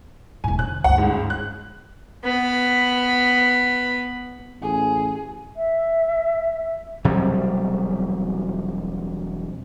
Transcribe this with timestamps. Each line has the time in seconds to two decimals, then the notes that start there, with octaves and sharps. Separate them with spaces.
0.44 E1 A2 G#5
0.59 D3 F#6
0.84 D2 G2 F#5
0.98 C#2 G#2
1.30 F#6
2.24 B3 B5
4.62 A1 G#4
5.56 E5
7.04 E1 C3 F#3 G3